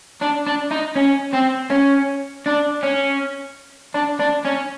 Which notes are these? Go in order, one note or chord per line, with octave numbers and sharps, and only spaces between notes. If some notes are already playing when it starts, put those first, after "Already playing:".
D4
D4
D#4
C#4
C4
C#4
D4
C#4
D4
D4
C#4